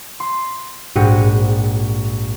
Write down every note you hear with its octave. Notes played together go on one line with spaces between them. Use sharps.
C6
A#1 G#2 F#4 G4 C#7 D#7